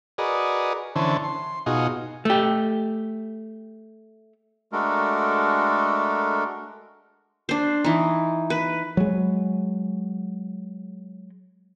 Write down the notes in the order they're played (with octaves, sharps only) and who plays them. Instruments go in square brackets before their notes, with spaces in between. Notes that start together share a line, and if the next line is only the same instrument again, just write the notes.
[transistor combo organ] F#4 G#4 A#4 B4 D5 D#5
D3 E3 C#4 C5 A5
C6
B2 D#4 F4 F#4 G#4
[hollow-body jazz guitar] A3 G4
[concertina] G#3 A3 D4 F#4 A4 A#4
[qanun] D4 C5
E3 D#4
B4
[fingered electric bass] F#3 G#3